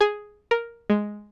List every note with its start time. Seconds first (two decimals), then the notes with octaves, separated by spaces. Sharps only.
0.01 G#4
0.51 A#4
0.90 G#3